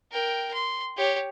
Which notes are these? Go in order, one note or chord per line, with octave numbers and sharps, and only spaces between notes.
A#4 G5
C6
G4 C#5